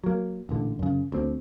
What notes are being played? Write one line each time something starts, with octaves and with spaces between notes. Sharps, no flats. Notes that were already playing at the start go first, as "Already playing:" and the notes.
F#3 A#3
A1 A#2 D3
F#2 C#3
D2 C4